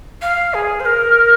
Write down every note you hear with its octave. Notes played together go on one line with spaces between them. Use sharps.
F5
G#4
C5
A#4